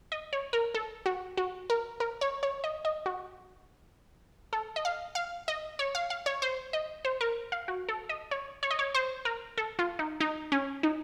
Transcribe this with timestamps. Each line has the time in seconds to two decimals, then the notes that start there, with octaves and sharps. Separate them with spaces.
0.12 D#5
0.33 C#5
0.53 A#4
0.74 A4
1.06 F#4
1.37 F#4
1.70 A#4
2.00 A#4
2.21 C#5
2.43 C#5
2.64 D#5
2.85 D#5
3.06 F#4
4.53 A4
4.76 D#5
4.85 F5
5.15 F5
5.48 D#5
5.79 C#5
5.95 F5
6.10 F5
6.26 C#5
6.42 C5
6.73 D#5
7.05 C5
7.21 A#4
7.52 F5
7.68 F#4
7.89 A4
8.09 D#5
8.31 C#5
8.63 C#5
8.71 D#5
8.79 C#5
8.95 C5
9.25 A#4
9.58 A4
9.79 F4
9.99 D#4
10.20 D#4
10.52 C#4
10.83 D#4